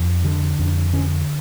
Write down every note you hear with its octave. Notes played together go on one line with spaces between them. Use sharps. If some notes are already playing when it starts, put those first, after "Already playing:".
Already playing: F2
D3
F2 D4
D3 C#4